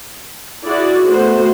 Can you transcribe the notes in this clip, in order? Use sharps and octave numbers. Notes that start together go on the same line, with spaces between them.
E4 F#4 G#4 D5
A3 B3 F#4 C5